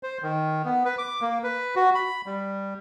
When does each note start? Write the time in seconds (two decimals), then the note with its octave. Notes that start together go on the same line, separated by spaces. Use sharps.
0.03 C5
0.23 D#3
0.65 B3
0.85 B4
0.98 D6
1.21 A#3
1.44 B4
1.76 F#4
1.95 B5
2.26 G3